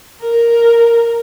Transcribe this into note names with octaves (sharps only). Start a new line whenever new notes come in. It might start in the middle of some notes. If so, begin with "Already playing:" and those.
A#4